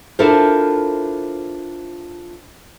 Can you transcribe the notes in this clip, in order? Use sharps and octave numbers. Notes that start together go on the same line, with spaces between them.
D4 E4 F4 A4 A#4 C5